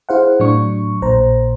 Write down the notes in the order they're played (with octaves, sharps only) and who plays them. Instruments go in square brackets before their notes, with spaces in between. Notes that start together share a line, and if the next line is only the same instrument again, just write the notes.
[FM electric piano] E4 G#4 C5 F5 F#5
A2 F#3 D4 C#6
A#1 A#2 C5 A#5